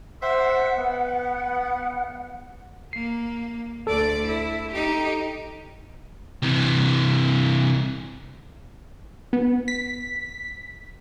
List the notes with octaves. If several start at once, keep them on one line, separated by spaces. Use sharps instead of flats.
C5 E5 F#5 C6
B3
A#3 C7
D2 A4 D5
E4
D#4 G4
C3 E3
B3
B6